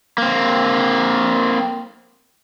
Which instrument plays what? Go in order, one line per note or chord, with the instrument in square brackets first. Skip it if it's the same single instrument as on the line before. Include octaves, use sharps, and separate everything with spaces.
[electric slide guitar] A#3 C4